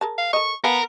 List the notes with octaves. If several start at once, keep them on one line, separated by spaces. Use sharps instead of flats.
G#4 A#4 A5
F5
A4 A#4 D#5 C#6
B3 A#4 F5 G#5 A5